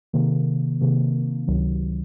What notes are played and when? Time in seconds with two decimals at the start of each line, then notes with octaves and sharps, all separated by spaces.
0.13 C3 D#3 A#3
0.81 C3 D#3 A#3
1.47 C#2 C3 D#3 F#3